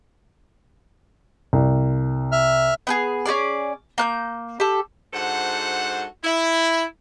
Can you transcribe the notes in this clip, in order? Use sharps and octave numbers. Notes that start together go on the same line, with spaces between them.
C2
E5 F6
B3 G4 G#4
C#4 F#4 G#4 D5
A#3 F#6 G6
G4 A4
G#2 D4 F#4 A4 C5 F#5
E4